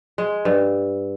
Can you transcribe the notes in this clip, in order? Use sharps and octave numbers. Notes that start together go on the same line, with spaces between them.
G#3
G2